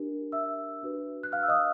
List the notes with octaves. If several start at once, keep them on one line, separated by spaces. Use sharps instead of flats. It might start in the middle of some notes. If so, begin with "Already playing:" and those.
Already playing: D4 G4 A#4
E5 E6
D4 F#4 B4
F#6
F5 F6
E6
D#5 D#6